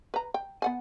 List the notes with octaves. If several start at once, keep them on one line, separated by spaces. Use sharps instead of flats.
B4 A#5
G5
B3 F#5 G#5